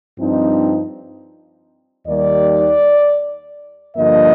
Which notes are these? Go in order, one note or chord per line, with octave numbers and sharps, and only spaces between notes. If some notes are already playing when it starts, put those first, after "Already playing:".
G2 F3 C4 D#4
D#2 D#3 G3 D5
G2 D3 F3 A#3 D#5